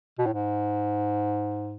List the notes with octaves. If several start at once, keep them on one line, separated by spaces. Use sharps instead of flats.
B2
A2
G#2